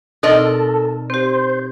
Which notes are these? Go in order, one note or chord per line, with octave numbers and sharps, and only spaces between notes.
B2 C4 D#4 A4 A#4 D5 D#5
C4 G4 C5